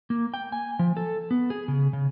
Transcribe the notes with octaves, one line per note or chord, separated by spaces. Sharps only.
A#3
G5
G#5
F3
A4
B3
G#4
C#3
C#3